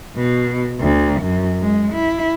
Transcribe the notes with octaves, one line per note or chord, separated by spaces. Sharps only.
B2
D2
F#2
G#3
E4